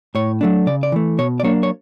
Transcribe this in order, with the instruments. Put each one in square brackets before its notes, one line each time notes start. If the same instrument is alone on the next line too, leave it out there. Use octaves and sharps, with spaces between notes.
[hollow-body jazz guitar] A2 C#5
F#3 A3 D4
C#3 D5
D5
E3 A3
B2 C#5
D5
F#3 A#3 D4 C#5
C#5